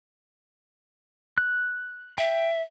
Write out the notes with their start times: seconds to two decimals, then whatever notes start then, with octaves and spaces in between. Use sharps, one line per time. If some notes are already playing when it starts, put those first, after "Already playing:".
1.38 F#6
2.18 E5 G5